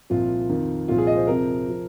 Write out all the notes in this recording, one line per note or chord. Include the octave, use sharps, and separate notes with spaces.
C2 A#2 F3 F4
F2 D#3
C2 A#2 F3 F4
G#4
D#5
C5
F2 C3 F3 A#4
F3